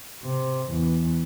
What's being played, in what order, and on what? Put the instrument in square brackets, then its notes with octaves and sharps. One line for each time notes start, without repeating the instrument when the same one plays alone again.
[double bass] C3
E2